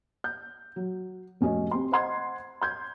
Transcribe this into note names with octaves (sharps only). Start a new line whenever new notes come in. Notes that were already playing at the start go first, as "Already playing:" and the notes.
G6
F#3
F1 C#4 F#4 D#5
C4 G4 C6
C5 D#5 F#5 C6 G#6
C6 G6 G#6